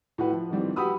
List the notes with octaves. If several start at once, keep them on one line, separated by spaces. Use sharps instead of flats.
A2 F#4 B4
F3
G#2 D#3 E3 G3 C4
F#4 G4 B4 B5 D#6 E6